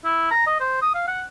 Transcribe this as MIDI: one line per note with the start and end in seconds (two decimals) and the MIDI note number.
0.05 0.30 64
0.31 0.45 82
0.47 0.57 75
0.60 0.81 72
0.82 0.91 87
0.95 1.07 77
1.08 1.21 78